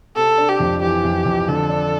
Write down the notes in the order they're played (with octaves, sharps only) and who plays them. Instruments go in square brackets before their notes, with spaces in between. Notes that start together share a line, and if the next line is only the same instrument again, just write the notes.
[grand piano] C3 [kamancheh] A4
[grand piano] D4
[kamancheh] G4
[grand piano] F2
[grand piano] E3 [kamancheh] G4
[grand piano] F2
F2
[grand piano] D3 [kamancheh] A4
[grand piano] D4